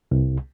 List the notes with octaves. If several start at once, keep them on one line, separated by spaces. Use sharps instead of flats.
C2